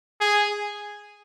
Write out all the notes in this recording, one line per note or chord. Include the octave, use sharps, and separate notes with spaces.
G#4